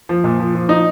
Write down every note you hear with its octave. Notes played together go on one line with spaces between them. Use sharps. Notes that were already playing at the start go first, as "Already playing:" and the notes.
F3
A#2
F3
F3
F3 D#4